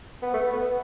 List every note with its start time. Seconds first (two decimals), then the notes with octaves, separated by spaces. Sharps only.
0.23 B3
0.34 A3
0.52 B3